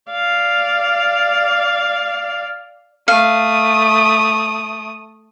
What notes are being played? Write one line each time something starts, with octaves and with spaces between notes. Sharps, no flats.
D5 F5
A3 F5 D#6